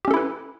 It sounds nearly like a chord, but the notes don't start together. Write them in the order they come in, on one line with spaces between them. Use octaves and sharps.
G4 C#4 A4 E4 B4